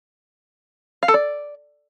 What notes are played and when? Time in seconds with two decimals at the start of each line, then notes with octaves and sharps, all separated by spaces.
1.03 F5
1.08 A4
1.14 D5